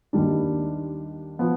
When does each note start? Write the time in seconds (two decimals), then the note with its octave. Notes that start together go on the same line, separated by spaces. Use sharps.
0.13 D#2 D#3 G3 D4
1.39 F3 B3